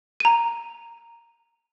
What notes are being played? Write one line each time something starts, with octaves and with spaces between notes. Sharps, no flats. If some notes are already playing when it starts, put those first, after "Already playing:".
A#5 D#7